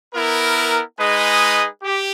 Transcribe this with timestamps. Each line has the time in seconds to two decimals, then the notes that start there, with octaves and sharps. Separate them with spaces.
0.14 B3 E4 A#4
0.98 G#3 D#4 G#4 B4 D#5
1.83 G4